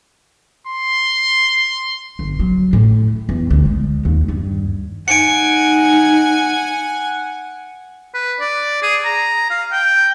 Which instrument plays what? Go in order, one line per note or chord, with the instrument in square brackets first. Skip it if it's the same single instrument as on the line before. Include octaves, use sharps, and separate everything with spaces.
[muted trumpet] C6
[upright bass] G1
F#3
A2
E2
D2
G#3
D#2
G2
[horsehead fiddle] D#4 [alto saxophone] F#5 [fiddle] G#5 [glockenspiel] C#7 D7
[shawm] B4
D5
G#4
A#5
F5
G5